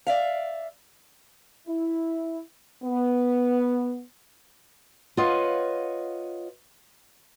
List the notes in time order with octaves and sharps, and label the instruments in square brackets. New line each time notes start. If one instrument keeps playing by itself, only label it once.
[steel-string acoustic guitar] D5 E5 F5
[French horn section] E4
B3
[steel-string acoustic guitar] F4 B4 C#5 D#5 F5 F#5